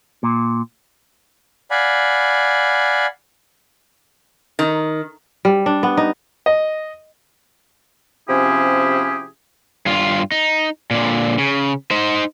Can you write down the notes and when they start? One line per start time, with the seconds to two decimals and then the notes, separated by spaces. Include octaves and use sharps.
0.23 A#2
1.71 D5 F5 F#5 G#5 B5
4.59 D#3
5.45 G3
5.66 D4
5.83 B3
5.97 D#4
6.46 D#5
8.29 C3 F3 C#4 E4 G4 G#4
9.86 G2 F4
10.32 D#4
10.91 A#2 D3
11.38 C#3
11.91 D#4 C5